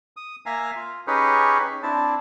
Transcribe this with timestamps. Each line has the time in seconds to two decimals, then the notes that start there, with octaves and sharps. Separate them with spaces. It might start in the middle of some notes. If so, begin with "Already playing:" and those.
0.17 D#6
0.46 A#3 E5 F5 G#5 A#5
0.76 F4
1.07 C#4 D#4 G4 G#4 B4 C#5
1.83 C4 D4 E4 A5